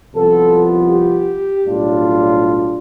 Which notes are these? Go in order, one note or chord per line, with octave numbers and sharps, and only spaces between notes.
C2 C3 F3 B3 F4 A4
G4
B1 A2 G3 D4 F4